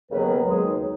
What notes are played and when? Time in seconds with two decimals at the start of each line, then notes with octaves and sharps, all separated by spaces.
0.11 D#2 C#3 F#3 B3 B4
0.47 D#2 C#3 F#3 G#3 G#4
0.64 D#4